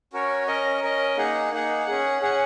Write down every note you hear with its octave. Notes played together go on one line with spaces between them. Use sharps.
C#4 F#4 A#4 C#5
C#4 A#4 D#5
C#4 A#4 D#5
A#3 D#4 G#4 F#5
A#3 D#4 G#4 F#5
C#4 G#4 F#5
C#4 G#4 F#5